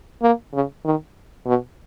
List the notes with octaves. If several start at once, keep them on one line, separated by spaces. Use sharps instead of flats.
A#3
C#3
D#3
B2